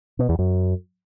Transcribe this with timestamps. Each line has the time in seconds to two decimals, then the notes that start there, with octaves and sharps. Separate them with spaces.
0.19 B2
0.29 E2
0.39 F#2